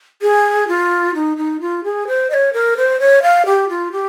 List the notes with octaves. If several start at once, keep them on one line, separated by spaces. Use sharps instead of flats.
G#4
F4
D#4
D#4
F4
G#4
C5
D#5
C#5
A#4
C5
C#5
F5
G4
F4
G4